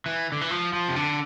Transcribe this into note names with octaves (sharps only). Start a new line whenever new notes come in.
E3
D3
E3
F3
F3
C3
D3